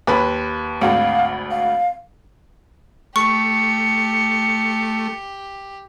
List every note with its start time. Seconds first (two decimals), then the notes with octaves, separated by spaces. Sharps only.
0.07 D#2 B4 B5
0.82 G#1 D2 F5
1.51 F5
3.16 A3 G4 C#6 C#7